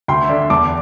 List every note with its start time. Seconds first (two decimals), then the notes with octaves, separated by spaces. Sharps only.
0.08 D2 G5 C6
0.24 E5
0.29 D3 D5
0.50 E2 A5 D6